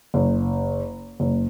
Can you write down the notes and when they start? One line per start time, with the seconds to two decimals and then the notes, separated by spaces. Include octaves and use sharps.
0.14 F#1
1.20 F#1